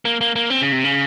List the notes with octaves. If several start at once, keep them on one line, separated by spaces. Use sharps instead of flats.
A#3
A#3
A#3
C4
C#3
C3
C#3